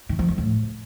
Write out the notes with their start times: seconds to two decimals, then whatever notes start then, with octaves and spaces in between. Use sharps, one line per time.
0.09 D#3
0.19 F3
0.28 F2
0.38 A2